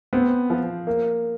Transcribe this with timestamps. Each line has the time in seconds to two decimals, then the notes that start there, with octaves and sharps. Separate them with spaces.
0.13 B3 C4
0.50 F3
0.87 A#3